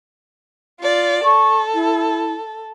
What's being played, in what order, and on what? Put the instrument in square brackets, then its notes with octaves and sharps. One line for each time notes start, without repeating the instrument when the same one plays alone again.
[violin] F4 D5
[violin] A4 [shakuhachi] C#6
[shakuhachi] E4